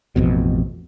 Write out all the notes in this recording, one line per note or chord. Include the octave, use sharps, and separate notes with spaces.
A1 F2 B2